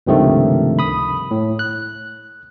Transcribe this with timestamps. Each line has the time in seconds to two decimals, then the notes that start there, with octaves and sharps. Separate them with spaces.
0.07 C#2 G2 C3 D#3 F3 A3
0.79 B5 D#6
1.31 A2
1.59 F#6